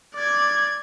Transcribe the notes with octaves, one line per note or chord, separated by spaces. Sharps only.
D5 G#6